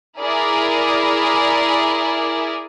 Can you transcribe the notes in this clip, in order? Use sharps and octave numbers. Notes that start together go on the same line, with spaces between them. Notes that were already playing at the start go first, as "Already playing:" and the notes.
E4 G#4 A#4 D5